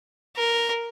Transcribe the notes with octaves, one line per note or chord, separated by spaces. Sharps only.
A#4